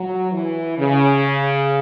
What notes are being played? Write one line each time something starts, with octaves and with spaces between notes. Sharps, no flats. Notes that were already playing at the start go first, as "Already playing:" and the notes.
Already playing: F#3
E3
C#3